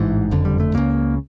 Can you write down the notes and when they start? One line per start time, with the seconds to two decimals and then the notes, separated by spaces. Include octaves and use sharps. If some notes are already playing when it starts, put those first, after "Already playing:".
Already playing: A1 G#2 E3
0.31 F#1 F2 D3
0.45 G3
0.60 A3
0.74 C#2 C#3 A#3